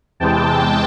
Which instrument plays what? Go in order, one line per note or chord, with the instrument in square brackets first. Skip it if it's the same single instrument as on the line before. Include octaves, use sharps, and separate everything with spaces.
[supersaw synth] E2 C3 E3 G#3 G5 A5